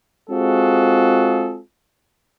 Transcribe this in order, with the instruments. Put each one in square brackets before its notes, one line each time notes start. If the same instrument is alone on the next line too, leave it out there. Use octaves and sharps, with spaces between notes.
[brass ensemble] G#3 C4 F4 F#4 G#4 A4